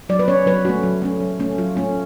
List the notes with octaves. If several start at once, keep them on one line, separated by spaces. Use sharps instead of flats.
F#3 D5
B4
C#4 C#5
F#3 B4
A3 C#4 F#4
F#3
A3 C#4
F#3
A3 C#4
F#3 F4
A3 C#4